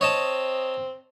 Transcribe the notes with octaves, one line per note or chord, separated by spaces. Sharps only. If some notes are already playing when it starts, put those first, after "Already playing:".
C4 C#5 D#5 A5